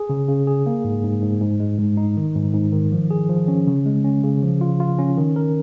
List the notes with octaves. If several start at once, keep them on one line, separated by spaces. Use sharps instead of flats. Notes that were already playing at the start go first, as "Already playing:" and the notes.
Already playing: G#4
C#3
C#3
G#4
A#3
G#2
G#2
G#2
G#2
G#3
G#2
D#4
D#3
G#2
G#2
D#3
F3
G#4
F3
C#4
C#3
G#3
C#4
C#3
F3
F4
F4
C#4
D#3
A#4